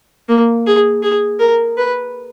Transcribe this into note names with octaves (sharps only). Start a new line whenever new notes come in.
A#3
G#4
G#4
A#4
B4